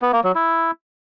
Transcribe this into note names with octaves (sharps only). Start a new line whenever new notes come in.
B3
A#3
F#3
E4